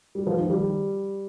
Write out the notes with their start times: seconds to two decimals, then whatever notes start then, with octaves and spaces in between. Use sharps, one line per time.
0.15 G3
0.27 F3
0.39 D#3
0.50 G3